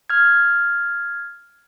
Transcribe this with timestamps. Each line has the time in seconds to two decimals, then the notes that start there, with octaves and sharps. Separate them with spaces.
0.10 F6 G#6